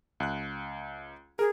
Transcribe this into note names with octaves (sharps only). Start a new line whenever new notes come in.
C#2 F#6
G#4 A#4